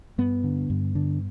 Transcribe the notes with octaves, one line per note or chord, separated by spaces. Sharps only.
G2 B3
D3
G2
D3